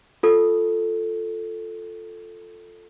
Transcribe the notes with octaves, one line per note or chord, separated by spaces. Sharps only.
F4 A4